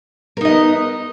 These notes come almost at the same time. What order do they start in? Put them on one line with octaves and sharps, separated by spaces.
A#4 D#4 D#5 B3